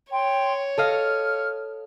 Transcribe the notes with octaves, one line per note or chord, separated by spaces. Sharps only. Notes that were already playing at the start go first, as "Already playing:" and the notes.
C#5 G5 C6
A4 D#5 F5 F6